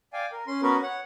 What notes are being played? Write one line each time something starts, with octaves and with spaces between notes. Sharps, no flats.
D5 F5 G5 G#5
A#4
C#4 C6
B3 C#4 F#4 A#4 B4
C#5 F#5